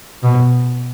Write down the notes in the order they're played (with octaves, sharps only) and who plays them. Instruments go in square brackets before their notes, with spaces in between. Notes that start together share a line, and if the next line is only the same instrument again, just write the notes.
[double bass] B2